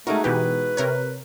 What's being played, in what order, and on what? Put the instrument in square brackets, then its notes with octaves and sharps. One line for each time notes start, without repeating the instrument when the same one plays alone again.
[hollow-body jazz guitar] G#3 D#4 F#4 [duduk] A3 [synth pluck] A#4
[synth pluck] B2 E3 G4 [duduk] B4
[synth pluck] C3 A#4 C#5